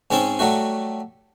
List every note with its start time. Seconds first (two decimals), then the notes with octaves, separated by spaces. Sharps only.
0.11 G#2 G#3 C4 C#4 A5
0.39 F#3 G3 A3 F#4